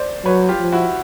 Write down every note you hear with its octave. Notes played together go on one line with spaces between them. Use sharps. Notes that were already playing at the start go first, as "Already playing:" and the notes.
Already playing: C5 D5
F#3 B4 C#5
F4 G4
F3
E4 F#4